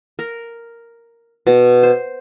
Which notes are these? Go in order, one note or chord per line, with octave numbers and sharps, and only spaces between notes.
A#4
B2
C5